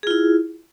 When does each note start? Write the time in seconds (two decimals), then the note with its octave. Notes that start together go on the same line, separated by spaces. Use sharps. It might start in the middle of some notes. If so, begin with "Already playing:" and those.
0.03 G#4
0.07 F4
0.11 E4